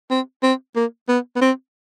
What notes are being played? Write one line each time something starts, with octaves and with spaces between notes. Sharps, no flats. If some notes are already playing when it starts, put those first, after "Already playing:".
C4
C4
A#3
B3
B3
C4